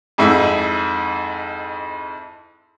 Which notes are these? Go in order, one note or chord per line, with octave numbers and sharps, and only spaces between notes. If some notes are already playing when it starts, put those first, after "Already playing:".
F2 G#2 E4